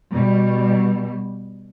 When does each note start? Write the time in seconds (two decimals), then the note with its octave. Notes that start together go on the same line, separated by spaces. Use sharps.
0.11 B2 G3